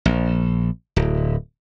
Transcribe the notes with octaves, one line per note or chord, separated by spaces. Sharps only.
A#1
D1